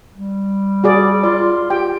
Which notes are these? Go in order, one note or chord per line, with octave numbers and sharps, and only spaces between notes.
G3
F#4 G#4 D5
F4 D5
G4 G5